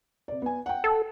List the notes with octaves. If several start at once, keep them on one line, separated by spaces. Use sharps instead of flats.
C3 D5
B3 G#5
F#5 G5
A4